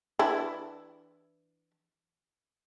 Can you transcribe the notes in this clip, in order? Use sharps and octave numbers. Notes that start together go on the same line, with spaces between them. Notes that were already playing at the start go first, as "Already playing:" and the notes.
E3 D4 E4